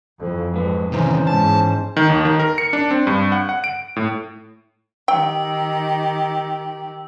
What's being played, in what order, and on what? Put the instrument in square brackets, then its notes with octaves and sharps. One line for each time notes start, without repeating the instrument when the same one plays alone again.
[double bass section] F2 E3
[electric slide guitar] G#2 B4 [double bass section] G#3
[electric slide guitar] E2 A#5 [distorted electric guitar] C3 D#3 [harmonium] C#4 C5
[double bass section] G#2 [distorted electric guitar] A5
[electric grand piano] D#3
D#2
D#3
A#4
C#7
D4
C4
G2
F#5
F#5
D7
A2
[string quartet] D#3 G4 [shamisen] G5 [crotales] E6